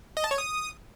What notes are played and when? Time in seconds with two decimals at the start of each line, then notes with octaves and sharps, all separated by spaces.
0.17 D#5
0.24 A5
0.31 C#5
0.38 D#6